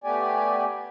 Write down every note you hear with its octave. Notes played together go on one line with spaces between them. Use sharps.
A3 B3 G4 D5 G#5